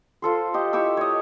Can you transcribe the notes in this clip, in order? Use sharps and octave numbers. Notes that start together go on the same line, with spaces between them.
F4 A4 C5
G4 D#5
E4 G4 C#6 E6
C#5 D#5